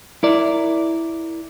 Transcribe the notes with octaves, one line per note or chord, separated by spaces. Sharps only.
E4 A#4 D5